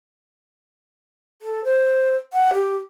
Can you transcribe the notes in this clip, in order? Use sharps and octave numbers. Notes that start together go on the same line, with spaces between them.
A4
C5
F#5
G4